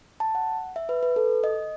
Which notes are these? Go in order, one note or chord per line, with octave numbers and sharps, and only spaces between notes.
A5
F#5
E5
B4
B4
A4
D#5